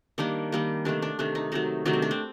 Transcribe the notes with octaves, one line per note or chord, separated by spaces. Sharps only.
D#3 G3 A#3 D4
D#3 G3 A#3
C3 D#3 A3 D4
D4
C3 D#3 A3 D4
D#4
C3 D#3 F#3 A3 D#4
C3 D#3 F#3 A3 D4
C4
D4
C4